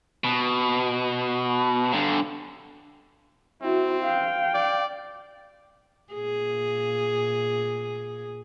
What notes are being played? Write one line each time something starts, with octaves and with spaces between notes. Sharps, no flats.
B2
G2 D3
C4 E4 F#4
F5 G5
D5
A#2 G#4